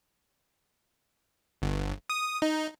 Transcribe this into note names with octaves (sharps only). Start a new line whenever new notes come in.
G1
D#6
D#4